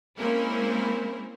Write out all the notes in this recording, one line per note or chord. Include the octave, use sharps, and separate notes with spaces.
G#3 A#3 C4 C#4 E4 A#4